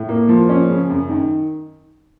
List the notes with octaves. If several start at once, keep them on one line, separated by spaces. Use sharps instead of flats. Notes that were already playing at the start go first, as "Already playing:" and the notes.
Already playing: A2
A#3
F3
C#4
C#3
F#2
D#3